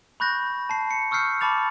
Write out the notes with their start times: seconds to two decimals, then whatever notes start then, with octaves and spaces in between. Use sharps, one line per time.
0.20 B5 C#6 F#6 G6 A#6
0.70 A5 C7
0.91 C#7
1.11 C#6 E6 F6 G6 C7 C#7
1.41 A5 B5 D6 A6 F7